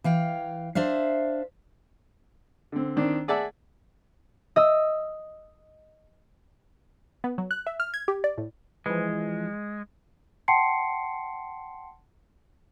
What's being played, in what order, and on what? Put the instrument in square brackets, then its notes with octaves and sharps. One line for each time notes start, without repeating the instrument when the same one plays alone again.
[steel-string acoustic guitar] E3 F5 G5
D4 C5 E5 F5
[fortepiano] D3 C4
D#3 C4 D4
G#4 D5 E5 F#5 A5
[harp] D#5 E6
[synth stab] B3
F#3
F#6
E5
F6
G#6
G4
D5
A2
[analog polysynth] E3 F3 [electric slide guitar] G#3
[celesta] F#5 G5 A5 C6 C7 C#7